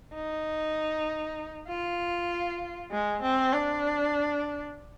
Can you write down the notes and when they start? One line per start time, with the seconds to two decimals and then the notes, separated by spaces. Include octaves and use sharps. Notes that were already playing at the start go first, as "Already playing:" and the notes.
0.14 D#4
1.68 F4
2.91 G#3
3.22 C4
3.53 D4